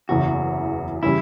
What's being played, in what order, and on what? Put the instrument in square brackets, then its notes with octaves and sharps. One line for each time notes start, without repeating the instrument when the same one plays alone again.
[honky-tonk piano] F#1 E2 C#3 E3 [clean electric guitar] F#4
[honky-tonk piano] C#3 E3 G3 C#4 [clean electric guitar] E4